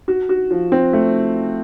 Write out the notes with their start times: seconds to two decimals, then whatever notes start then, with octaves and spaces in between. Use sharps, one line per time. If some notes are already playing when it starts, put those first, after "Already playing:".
0.08 F#4
0.29 F#4
0.51 F3
0.72 C4
0.93 A3